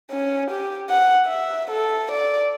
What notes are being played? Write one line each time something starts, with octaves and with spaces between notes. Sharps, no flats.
C#4
G4
F#5
E5
A4
D5